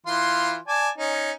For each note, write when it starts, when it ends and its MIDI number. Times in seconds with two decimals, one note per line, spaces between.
0.06 0.56 52
0.06 0.56 65
0.06 0.56 84
0.68 0.89 74
0.68 0.89 80
0.68 0.89 81
0.98 1.32 61
0.98 1.32 63